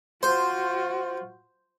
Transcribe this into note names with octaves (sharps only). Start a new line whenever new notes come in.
F4 F#4 C5